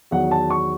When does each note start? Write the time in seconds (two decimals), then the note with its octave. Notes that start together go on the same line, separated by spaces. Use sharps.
0.11 E2 D#3 F#3 F#5
0.31 A5
0.50 C#6